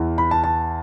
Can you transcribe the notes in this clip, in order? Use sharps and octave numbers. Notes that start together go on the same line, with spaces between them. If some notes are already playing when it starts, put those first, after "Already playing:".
Already playing: E2 E3
B5
A5
A5